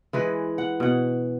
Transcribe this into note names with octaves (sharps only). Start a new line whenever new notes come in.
E3 G#3 B4
F#5
B2 F#5